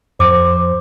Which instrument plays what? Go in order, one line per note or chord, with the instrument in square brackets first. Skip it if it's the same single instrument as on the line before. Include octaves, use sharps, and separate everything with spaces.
[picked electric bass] F2 [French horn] C5 [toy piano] D6